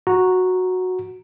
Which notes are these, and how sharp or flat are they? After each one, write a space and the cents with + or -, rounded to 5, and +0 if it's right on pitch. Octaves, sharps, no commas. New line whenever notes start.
F#4 -10 A#5 +0